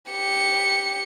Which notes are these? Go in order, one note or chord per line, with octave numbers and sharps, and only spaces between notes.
G4 C#7